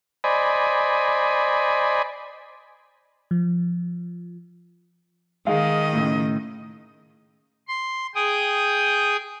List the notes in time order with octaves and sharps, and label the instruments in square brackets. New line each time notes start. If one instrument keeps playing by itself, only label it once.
[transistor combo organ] C5 D5 D#5 G#5 B5
[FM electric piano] F3
[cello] D#3 D#5 [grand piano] G#3 F5
[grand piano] A2 C#3
[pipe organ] C6
G#4 G5 D#6